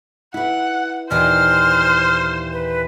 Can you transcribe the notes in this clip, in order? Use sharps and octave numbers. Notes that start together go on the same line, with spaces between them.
E4 B4 F#5
D#2 A#2 E3 C5 F6
B4